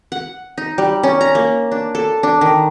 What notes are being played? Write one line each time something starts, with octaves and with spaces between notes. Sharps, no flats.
F#5
D#4
G3
C#4
A#5
A#3
D4
A4
D4
D#3